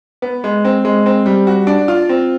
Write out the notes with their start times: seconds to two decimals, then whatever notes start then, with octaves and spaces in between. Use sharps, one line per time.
0.22 B3
0.44 G#3
0.65 C4
0.85 G#3
1.06 C4
1.26 G3
1.47 F#4
1.67 D4
1.88 F4
2.09 C4